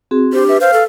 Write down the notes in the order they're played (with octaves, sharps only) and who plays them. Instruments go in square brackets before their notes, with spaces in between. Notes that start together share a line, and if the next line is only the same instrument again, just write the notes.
[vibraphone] C4 F#4 G#4
[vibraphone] D4 [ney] G4 [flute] C5
[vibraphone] B4 [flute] E5
[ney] C5 [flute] F5
[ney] A4